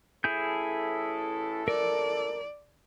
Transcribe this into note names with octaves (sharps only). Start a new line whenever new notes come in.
A1 A2 E4 G#4 A4 G6
A#4 D5